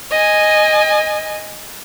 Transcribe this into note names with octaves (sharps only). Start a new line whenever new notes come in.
D#5 G#5